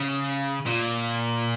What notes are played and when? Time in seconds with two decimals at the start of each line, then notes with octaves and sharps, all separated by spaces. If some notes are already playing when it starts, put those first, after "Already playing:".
Already playing: C#3
0.66 A#2